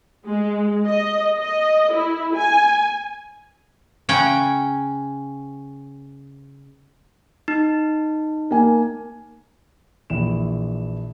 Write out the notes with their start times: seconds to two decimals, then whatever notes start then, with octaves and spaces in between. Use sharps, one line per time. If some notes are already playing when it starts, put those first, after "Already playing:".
0.27 G#3
0.88 D#5
1.40 D#5
1.94 E4
2.35 G#5
4.09 C#3 C#4 F#5 G5
7.48 D#4
8.51 A#3 G#5
10.10 A#1 E3 E4 E7